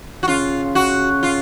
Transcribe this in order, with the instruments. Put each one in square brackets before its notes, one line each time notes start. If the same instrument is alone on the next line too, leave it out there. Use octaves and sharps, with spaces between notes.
[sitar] F#4
[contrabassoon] C#3 [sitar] F4
[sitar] F#4
F4